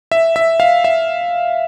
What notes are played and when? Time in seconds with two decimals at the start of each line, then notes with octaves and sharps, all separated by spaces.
0.12 E5
0.36 E5
0.60 F5
0.84 E5